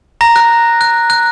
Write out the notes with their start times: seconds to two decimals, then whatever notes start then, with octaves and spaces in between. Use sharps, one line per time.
0.21 A#5 A#6
0.36 F#6
0.81 F#6
1.10 F#6